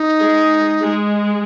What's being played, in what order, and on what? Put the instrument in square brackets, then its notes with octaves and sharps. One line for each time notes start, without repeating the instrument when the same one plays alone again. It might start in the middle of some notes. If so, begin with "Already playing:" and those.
Already playing: [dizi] D#4
[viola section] G#3 G#4
G#3 G#4